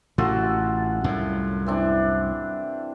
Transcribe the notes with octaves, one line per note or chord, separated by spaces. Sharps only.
A1 A2 C3 F4 F#4 A4
C2 F#2 A2
E3 C4 D4